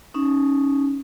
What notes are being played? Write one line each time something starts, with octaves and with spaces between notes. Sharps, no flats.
C#4 D#4